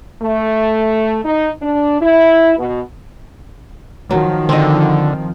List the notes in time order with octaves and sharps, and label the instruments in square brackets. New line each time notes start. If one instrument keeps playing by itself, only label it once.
[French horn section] A3
D#4
D4
E4
B2
[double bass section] D#3 F3 [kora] F#3
[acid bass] D3 [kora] C4 D#5